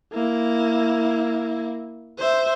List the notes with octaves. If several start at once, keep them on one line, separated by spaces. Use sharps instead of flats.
A#3 E4
C5 E5